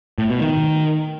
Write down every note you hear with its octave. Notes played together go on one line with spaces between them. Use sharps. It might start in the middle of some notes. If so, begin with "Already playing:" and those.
A2
B2
D#3